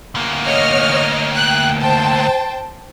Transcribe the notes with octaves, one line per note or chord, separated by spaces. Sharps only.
D2 A#3
C#5 D#5 F6
G5 F#6
C5 G5 A5